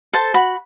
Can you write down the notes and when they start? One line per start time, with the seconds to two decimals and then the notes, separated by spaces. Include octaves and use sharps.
0.13 A4 C5 A5
0.34 F#4 B5